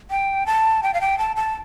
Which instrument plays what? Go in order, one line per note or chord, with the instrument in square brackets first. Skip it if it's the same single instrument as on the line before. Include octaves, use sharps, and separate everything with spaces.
[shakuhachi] G5
A5
G5
F5
G5
A5
A5